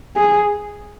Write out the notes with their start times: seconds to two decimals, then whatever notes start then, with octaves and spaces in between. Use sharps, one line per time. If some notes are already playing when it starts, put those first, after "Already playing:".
0.17 G#4